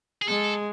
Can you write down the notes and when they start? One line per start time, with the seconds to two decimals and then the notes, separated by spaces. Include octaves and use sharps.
0.22 G#4
0.28 G#3 A4